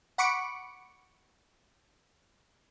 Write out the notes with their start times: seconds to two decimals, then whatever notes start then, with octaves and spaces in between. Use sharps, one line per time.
0.18 F#5 B5 C#6 D6 C#7 D7